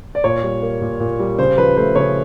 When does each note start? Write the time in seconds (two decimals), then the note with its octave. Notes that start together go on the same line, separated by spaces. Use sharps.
0.15 D5
0.24 A#2 C#5
0.43 G3
0.62 A#3
0.81 A#2
1.00 A#2
1.19 G3
1.39 C#3 C5
1.58 F3 B4
1.76 A3 C5
1.96 C#3 C#5